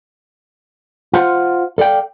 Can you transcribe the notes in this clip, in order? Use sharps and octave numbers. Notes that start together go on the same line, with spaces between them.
F4 C5 F#5
A4 D5 F5 G5